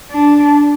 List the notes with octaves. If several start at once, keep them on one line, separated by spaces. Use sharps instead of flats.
D4